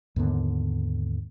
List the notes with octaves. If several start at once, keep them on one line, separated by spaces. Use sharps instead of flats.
D#2 G#2 D3 B3